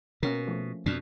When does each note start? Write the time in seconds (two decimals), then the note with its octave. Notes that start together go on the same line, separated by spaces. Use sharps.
0.23 B2 A#3 C#4 A#4
0.47 F3 A3
0.86 F2 B2 D4